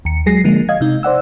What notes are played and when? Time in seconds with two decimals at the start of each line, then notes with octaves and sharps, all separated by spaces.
0.05 D#2 C#7
0.26 F#3 G#3 G#4 A#6 C7
0.44 D3 F3 G#3 A#3
0.69 D#5 F5 G#6
0.81 C3 D#4
1.03 C5 D5 F#5 E6